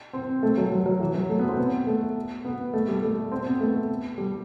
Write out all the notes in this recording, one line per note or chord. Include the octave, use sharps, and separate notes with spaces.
C4
A3
F#3
F#3
F#3
E3
F#3
A3
B3
C4
B3
A3
B3
A3
G3
A3
C4
B3
A3
G3